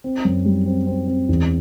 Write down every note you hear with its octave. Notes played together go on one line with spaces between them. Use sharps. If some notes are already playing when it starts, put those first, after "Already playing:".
C4
F#2
G3
C4
C4
C4
E2